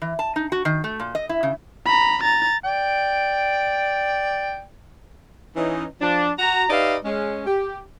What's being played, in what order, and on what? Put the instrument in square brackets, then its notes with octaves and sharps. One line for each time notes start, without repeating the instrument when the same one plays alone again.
[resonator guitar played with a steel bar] E3
A5
D#4
F#4
D#3
A3
A#2
D#5
E4
C#3
[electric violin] A#5 B5
A#5 A6
[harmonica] D5 G5
[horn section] E3 C#4 D#4
F3 D4
F#4 A#5
D#4 G4 B4 D5 E5 F5
G#3 C#4
G4